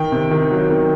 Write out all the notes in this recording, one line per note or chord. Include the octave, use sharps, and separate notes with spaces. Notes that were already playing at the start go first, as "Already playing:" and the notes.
Already playing: D#3 G5
C3
D#3
F#3
D#3